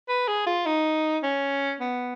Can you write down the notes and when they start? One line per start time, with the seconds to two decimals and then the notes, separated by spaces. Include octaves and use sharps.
0.09 B4
0.28 G#4
0.46 F4
0.66 D#4
1.23 C#4
1.80 B3